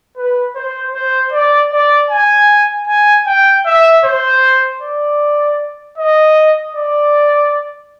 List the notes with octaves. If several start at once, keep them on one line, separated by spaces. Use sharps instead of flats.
B4
C5
C5
D5
D5
G#5
G#5
G5
E5
C5
D5
D#5
D5